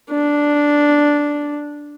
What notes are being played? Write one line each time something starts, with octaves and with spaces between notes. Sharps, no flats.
D4